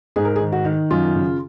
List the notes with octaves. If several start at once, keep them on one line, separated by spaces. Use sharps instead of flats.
G#2 G#4
A#4
G#4
D#3
F#4
D#3
F#2 F4
C#3